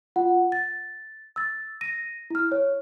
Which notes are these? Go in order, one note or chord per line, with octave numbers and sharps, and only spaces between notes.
F4 F#5
A6
E6 A6
A#6 D#7
E4 F6
C#5